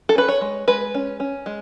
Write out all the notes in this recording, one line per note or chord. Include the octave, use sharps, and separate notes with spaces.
A4
C#4 B4
C#5
G#3
G#3 B4
C#4
C#4
G#3